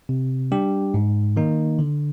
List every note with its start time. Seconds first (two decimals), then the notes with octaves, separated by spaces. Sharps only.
0.09 C3
0.52 G3 D4 G4
0.94 G#2
1.36 D#3 A#3 D#4
1.79 D3